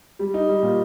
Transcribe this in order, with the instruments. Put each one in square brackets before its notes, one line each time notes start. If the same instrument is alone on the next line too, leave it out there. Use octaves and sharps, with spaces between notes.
[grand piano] G3
D#4
G3
A#2